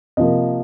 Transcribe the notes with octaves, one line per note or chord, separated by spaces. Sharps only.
C3 F3 A#3 D#5